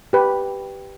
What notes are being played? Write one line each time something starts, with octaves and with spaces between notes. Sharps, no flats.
G4 B4